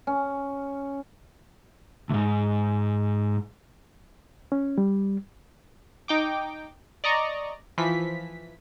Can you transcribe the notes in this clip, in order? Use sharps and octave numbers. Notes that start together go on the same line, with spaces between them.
C#4
D2 G#2
C#4
G3
D#4 G5 D6
D5 D#5 A#5 C#6
E3 F3 B6